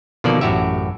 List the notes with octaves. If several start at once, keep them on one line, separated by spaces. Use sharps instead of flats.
B2 D3 D#3 F3 A#3 D5
A1 F#2 A2 F#4 G4 E5